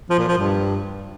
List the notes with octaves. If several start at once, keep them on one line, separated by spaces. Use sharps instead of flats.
F3
A#2
F3
G2